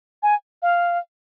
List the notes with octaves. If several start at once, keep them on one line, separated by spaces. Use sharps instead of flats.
G#5
F5